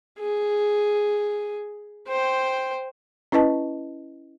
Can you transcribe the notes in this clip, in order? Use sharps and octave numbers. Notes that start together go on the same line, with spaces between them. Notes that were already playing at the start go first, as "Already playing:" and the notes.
G#4
C5 G5
C#4 E4 B4 D#5 A5